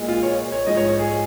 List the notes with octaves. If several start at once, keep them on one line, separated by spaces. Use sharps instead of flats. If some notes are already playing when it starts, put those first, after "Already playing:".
Already playing: A#2 G#3
F4
C#5
C#5
G#2 F3 G#3 D#5
C#5
C#5
G#4